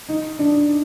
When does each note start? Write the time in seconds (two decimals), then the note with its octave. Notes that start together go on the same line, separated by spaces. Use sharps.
0.09 D#4
0.39 D4